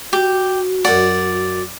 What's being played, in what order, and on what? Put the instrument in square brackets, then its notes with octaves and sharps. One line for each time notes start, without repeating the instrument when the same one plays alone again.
[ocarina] F#4 [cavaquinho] G4
[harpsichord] F#2 F#5 [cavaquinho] D5